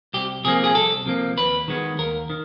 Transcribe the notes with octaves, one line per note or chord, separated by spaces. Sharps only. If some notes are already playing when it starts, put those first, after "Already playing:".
C2 G4
C3 F3 A#3 G#4
G#4
C2 A4
C3 F3 A#3
D#2 B4
D#3 G#3 B3
D#2 A#4
D#3